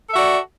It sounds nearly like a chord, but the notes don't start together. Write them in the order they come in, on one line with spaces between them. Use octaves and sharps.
A4 E5 F#4 D5